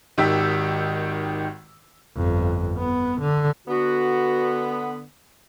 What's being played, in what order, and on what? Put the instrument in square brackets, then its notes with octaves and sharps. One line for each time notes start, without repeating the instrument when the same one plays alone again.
[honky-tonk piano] G#1 D#3 G4 E6 B6
[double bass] G1 F2
B3
D3
[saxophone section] D3 B3 [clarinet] F#4